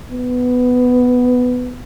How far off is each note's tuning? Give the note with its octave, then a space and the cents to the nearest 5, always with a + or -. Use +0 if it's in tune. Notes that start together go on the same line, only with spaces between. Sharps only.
B3 +10